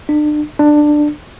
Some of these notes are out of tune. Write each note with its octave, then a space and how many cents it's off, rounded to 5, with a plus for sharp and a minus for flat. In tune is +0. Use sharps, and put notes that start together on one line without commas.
D4 +35
D4 +15